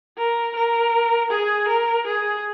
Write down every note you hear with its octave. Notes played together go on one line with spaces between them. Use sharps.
A#4
A#4
G#4
A#4
G#4